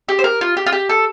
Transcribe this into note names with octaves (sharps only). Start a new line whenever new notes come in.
G4
C5
A#4
F4
G4
F4
G4
A4